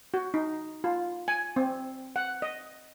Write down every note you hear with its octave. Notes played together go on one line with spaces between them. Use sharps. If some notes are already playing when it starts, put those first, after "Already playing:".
F#4
D#4
F4
G#5
C4
F#5
D#5